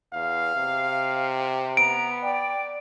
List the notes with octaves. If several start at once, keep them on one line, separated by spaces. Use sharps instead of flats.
E2 F5
C3
B3 A#5 D7
D5 G5